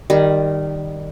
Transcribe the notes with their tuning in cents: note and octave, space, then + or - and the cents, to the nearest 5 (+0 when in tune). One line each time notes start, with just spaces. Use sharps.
D#3 -15 G3 +0